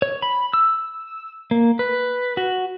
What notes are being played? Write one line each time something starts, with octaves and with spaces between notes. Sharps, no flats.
C#5
B5
E6
A#3
B4
F#4